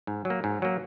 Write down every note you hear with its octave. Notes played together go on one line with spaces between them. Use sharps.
G#2
F#3
A#3
G#2
F#3 A#3